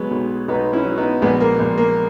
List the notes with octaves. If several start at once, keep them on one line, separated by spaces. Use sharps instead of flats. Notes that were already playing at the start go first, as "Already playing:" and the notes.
Already playing: F#3 G#3 B3
B1
B1 B3 D#4
C#4 E4
F#3
B3 D#4
A#1 G#3 B3
A#3
A#1
A#3